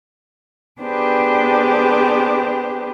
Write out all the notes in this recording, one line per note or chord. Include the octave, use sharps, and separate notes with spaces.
B3 D4 G4 G#4 B4 C5